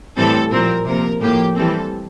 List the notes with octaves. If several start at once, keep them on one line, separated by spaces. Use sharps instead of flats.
A2 E3 G3 C4 A4
A#2 F3 C4 A#4
C3 F3 A#3 A#4
A2 F3 A#3 G4
E3 G3 C4 A4